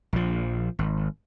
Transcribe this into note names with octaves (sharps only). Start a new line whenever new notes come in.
A#1 F3
G#1